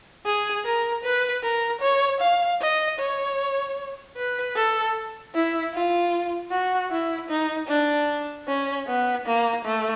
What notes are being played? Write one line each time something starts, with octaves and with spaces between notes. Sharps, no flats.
G#4
A#4
B4
A#4
C#5
F5
D#5
C#5
B4
A4
E4
F4
F#4
E4
D#4
D4
C#4
B3
A#3
A3